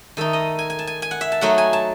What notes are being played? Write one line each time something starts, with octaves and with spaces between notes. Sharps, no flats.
D#3 A3 D#4 A4
D#5
G#5
G#5
A5
G#5
G#5
F#5
E5
A5
F#3 A3 D#4 F#5
G#5
A5